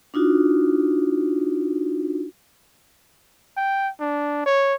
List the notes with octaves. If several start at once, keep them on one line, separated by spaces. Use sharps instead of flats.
D4 D#4 F4 F#4
G5
D4
C#5